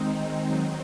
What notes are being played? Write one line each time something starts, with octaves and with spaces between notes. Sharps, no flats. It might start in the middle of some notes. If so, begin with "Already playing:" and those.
Already playing: D#3 G#3 C4 D#4
D#3 F#3 C4 D#4